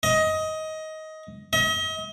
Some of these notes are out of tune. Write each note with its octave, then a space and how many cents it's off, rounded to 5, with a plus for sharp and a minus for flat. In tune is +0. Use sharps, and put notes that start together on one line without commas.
D#5 +15
D#5 +40